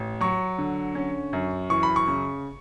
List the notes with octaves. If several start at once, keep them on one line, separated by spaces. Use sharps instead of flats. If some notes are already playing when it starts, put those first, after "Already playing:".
Already playing: A1
F#3 C#6
D3
C#4
F#2
E3 C#6
B5
C#6
C#3